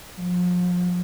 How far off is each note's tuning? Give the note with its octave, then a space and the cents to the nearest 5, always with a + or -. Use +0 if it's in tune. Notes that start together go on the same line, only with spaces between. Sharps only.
F3 +35